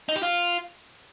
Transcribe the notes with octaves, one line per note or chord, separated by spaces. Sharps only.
D#4
G4
F4